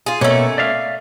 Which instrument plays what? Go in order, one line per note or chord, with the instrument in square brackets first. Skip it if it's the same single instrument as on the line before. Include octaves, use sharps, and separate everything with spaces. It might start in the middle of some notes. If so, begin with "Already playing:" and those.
[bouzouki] F4 G#4
[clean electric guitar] B2 A#3 [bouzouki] A3 C#4
[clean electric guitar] D5 E5 F5